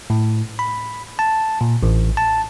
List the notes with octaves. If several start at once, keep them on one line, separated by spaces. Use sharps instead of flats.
A2
B5
A5
A#2
A1
A5